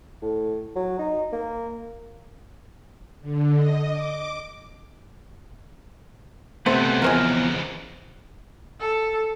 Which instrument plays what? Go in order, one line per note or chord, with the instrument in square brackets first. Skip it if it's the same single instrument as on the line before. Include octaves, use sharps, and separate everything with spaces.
[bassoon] A2
F#3
D#4
A#3
[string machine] D3
D#5
D6
[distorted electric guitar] C#2 E3 [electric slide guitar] C3 A3 B3 [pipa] C5
[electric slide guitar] E2 F3 [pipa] G#3 C4 A#4
[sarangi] A4